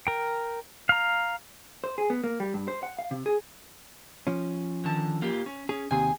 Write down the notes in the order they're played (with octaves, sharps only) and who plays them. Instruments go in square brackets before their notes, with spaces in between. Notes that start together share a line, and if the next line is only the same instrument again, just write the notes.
[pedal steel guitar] A#4 G5
F5 A#5
[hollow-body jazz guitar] C5
G#4
B3
A#3
G3
G2
C5
F#5
F5
C3
G#4
F3 C#4
[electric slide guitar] D3 D#3 A5
A#3 F4 G4
C#4
[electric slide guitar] C#4 [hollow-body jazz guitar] G#4
[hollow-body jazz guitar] D#2 C3 [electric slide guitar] G#4 G#5